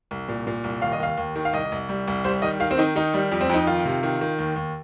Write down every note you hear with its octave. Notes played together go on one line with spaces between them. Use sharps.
C2
A#2
A#2
C2
D#2 F5
D#5
D#2 F5
D#2
D#3
F5
C2 D#5
C2
G3
C2
G3 C5
D#3 D#5
D#3 F5
C4
D#3 D#4
D#3 D#4
G3
F2
C4
F2 D#4
D#3 F4
C3
D#3
D#3
D#2
D#2